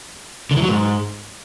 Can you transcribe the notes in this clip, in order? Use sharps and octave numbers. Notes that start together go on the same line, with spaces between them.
D3
E3
F#3
G#2